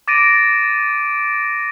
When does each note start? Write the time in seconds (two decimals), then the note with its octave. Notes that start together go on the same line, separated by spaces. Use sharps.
0.08 D6 A6 A#6 D7 D#7